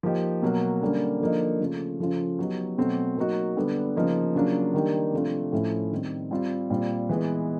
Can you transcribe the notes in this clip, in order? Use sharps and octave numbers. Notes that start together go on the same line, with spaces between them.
F3 A#3 D#4 G4
B2 F#3 A#3
D3 G3 A#3 C#4
D3 F3 A#3 D#4
C#3 F3 A3
C#3 F3 A3 C#4 F4
F#3 B3 D#4 G4
B2 F#3 A3 C4
F#3 A#3 D#4 F#4
D3 G3 B3
C#3 F3 A#3 D#4
C#3 F#3 A#3 D4 F4
D#3 G3 A#3 D4 G4
C3 F3 A3 D4 F4
A2 F3 A3 C#4 E4
D#3 G3 C4
G3 C4 F4
A#2 G3 C4 F4
E3 G#3 B3